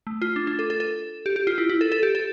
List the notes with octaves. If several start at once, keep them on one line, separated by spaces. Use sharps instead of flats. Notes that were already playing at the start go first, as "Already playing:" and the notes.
A3
F4
D4
D4
A4
A4
A4
G4
G4
F4
E4
E4
A4
A4
G4
A4